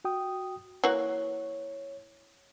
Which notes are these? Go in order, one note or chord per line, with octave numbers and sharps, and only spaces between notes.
F#4 G5 D#6
E3 A#3 F#4 C#5